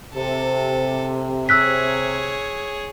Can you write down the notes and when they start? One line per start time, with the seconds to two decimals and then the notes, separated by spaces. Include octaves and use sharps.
0.14 C3 A4
1.49 G#4 C#5 E6 F#6 B6